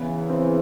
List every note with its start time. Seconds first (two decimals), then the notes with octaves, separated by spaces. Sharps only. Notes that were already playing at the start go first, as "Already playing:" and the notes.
Already playing: E2 C#3 E3 B3
0.29 C4